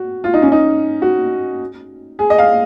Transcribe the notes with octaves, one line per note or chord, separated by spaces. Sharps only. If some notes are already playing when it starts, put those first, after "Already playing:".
Already playing: F#4
F4
D#4
C#4
D#4
F#4
G#4
D#5
F5